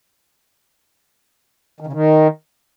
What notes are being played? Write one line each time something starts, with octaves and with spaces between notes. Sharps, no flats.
D#3
C#3
D#3